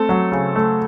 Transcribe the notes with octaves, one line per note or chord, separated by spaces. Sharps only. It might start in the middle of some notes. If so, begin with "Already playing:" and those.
Already playing: A3 C4 A4
F#3
C#3
A3